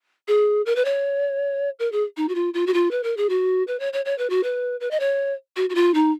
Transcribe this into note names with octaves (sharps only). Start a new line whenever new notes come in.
G#4
A#4
B4
C#5
A#4
G#4
D#4
F#4
F4
F4
F#4
F4
B4
A#4
G#4
F#4
B4
C#5
C#5
C#5
B4
F#4
B4
B4
D#5
C#5
F#4
F#4
F4
D#4